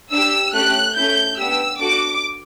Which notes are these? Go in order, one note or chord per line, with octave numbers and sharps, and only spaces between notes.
D4 G4 E6
A3 C#4 G4 F#6
A3 C#4 E4 G6
B3 D4 G4 E6
D4 F#4 A4 D6